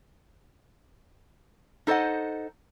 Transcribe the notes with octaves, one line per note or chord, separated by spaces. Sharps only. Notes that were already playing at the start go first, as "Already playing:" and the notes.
D#4 A4 C5 D#5 F#5